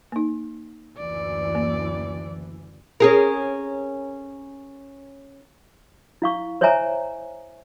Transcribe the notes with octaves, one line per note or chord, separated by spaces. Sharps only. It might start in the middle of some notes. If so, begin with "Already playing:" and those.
A#3 D#4
F#1 D2 E3 D5
A#3
C#4 G#4 A#4
E4 F5 C#6
C5 C#5 D#5 E5 G#5 A#5